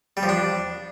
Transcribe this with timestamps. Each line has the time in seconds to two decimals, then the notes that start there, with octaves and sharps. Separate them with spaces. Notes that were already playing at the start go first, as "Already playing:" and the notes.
0.17 G3
0.23 F3
0.29 D4